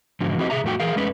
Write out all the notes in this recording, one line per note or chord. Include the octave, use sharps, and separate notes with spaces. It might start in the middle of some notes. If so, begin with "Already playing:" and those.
G#2 D3 F3 F#3
F3 C4 E4 F#4 G4 D#5
C3 G#4 E5 A#5
F2 A2 A3 F#4 G5
E3 G#4 A#4 F5
F2 G#3 A3 C#4 B4